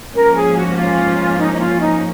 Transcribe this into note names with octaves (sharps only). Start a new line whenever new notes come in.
G#2 F3 A#3 C#4 A#4
G#4
F#4
F4
D#4
D#4
F4
D#4